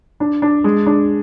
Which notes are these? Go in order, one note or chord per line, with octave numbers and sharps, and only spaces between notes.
D4
D4
G#3
D4